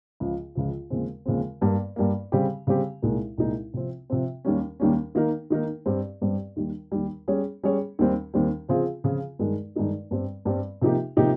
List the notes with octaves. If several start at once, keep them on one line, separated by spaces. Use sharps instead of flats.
C#2 C#3 F3
C#2 C#3 F3
D#2 C#3 F3 G#3 C4
D#2 C#3 F3 G#3 C4
G2 G3 A#3
G2 G3 A#3
C#3 G3 C4 G4
C#3 G3 C4 G4
C2 A#2 G#3 D#4 A#4
C2 A#2 G#3 D#4 A#4
C3 F3 C4
C3 F3 C4
D#2 D#3 G3 A#3 C#4
D#2 D#3 G3 A#3 C#4
D#3 A#3 D#4 A#4
D#3 A#3 D#4 A#4
G2 G3 C4 G4
G2 G3 C4 G4
D#2 D#3 G3
D#2 D#3 G3
G3 C#4 G#4 C#5
G3 C#4 G#4 C#5
D#2 D#3 G3 C4
D#2 D#3 G3 C4
C#3 F3 C4 F4 G#4
C#3 F3 C4 F4 G#4
G2 D#3 G#3 D#4 A#4
G2 D#3 G#3 D#4 A#4
G2 G3 C4
G2 G3 C4
C3 F3 A#3 D#4 G4
C3 F3 A#3 D#4 G4